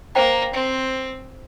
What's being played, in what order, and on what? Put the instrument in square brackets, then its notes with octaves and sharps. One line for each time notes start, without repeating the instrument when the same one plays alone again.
[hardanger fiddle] A#3 [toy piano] C5 G5 A#5
[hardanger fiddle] C4